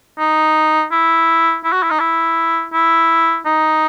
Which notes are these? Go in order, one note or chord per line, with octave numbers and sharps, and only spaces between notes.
D#4
E4
E4
F#4
E4
D#4
E4
E4
D#4